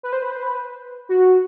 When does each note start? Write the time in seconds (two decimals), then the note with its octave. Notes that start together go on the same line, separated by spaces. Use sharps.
0.03 B4
0.13 C5
0.22 B4
0.32 C5
0.42 B4
1.09 F#4